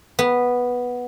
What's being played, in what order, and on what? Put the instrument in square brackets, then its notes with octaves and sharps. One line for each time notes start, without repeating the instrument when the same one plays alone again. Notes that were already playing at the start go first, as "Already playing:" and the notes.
[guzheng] B3